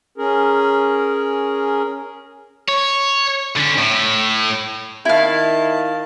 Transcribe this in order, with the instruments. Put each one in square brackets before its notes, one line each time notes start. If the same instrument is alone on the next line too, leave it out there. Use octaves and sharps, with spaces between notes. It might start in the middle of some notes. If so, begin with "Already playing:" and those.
[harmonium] C#4 G#4 A#4
[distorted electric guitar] C#5
D3 C#4
A2
[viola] D#3 A5 [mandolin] E4 F5